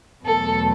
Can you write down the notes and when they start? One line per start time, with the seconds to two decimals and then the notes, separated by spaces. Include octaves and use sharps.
0.25 E2 B2 F#3 A3 A4